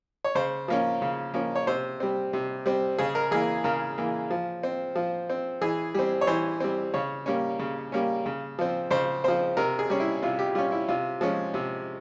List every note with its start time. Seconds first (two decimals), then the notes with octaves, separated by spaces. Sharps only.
0.25 C#5
0.35 C#3 C5
0.68 F3 A#3 C#4
1.02 C#3
1.34 F3 A#3 C#4
1.56 C#5
1.67 C3 C5
2.00 G3 C4
2.33 C3
2.66 G3 C4
2.99 C#3 G#4
3.15 A#4
3.31 E3 A#3 G#4
3.64 C#3 A#4
3.98 E3 A#3
4.31 F3
4.63 C4
4.96 F3
5.30 C4
5.61 E3 G#4
5.94 G3 C4
6.21 C#5
6.27 E3 C5
6.60 G3 C4
6.94 C#3 C#5
7.26 G3 A#3 C#4
7.59 C#3
7.92 G3 A#3 C#4
8.26 C#3
8.59 F3 C4
8.91 C#3 C5
9.24 F3 C4 C5
9.57 C3 A#4
9.79 G#4
9.90 G3 C#4
10.00 E4
10.22 C3 F4
10.39 G4
10.55 G3 C#4 F4
10.72 E4
10.88 C3 F4
11.21 F3 G#3 C#4
11.54 C3